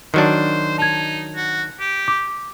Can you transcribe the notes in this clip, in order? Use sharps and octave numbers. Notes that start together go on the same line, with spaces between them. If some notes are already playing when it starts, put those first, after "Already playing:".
D#3 F#3 D4 C5
D#4 A5 G#6
F#4
G4
D6